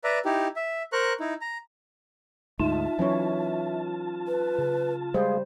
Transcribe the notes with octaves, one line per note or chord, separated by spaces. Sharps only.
B4 D5 E5 A#5
D#4 E4 G4
E5
A#4 C5 A#5 C#6 F#6
D#4 E4
A#5
D2 G#2 D#4 F4 E5 A5
E3 F#3 C#4 C#5
B4
C#3
G3 G#3 G#4 C5 F5